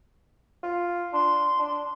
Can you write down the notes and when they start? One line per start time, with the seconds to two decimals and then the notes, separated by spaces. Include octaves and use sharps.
0.63 F4
1.13 D4 C6
1.59 D4